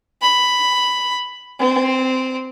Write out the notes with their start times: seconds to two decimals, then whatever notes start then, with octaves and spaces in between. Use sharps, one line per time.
0.22 B5
1.60 C4